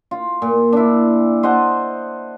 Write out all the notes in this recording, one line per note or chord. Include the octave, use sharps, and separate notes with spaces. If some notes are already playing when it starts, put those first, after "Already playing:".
F4
A#2
D4 E4
C5 D#5 F#5 A5